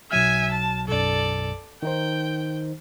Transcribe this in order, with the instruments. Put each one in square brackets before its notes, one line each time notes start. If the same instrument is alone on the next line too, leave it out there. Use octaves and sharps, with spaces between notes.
[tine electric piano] B1 F#3 F6 [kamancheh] E5 G#5
[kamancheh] A5
[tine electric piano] B1 F#2 [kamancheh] A4 D5
[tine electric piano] D#3 D#4 C5 [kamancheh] G5